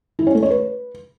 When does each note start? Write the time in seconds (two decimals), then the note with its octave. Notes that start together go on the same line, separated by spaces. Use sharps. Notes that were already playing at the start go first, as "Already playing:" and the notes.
0.19 E4
0.27 C#4
0.35 A3
0.43 C#5
0.50 B4